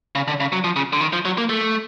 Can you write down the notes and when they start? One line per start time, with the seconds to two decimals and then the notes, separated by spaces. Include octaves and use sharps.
0.15 C#3
0.28 D3
0.40 C#3
0.53 F#3
0.64 F3
0.76 C#3
0.93 D3
1.01 D#3
1.13 F3
1.25 F#3
1.38 A#3
1.49 A3